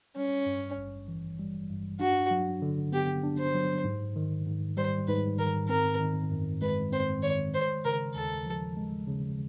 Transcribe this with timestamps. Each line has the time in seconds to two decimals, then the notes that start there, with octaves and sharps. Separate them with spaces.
0.16 G3 C#4
0.46 G2
0.77 G#1
1.08 E3
1.39 G3
1.69 G2
2.00 D4 F#4
2.31 F#3
2.62 D3
2.92 B3 G4
3.23 D4
3.39 C5
3.55 F#3
3.85 G#2
4.16 D#3
4.46 G#2
4.77 G3 C5
5.08 G#2 B4
5.39 D#3 A#4
5.69 C4 A#4
6.00 D#3
6.30 F#2
6.61 G#3 B4
6.92 C4 C5
7.22 D#3 C#5
7.53 G#3 C5
7.85 C#3 A#4
8.15 D#2 A4
8.46 F3
8.77 G#3
9.08 C#3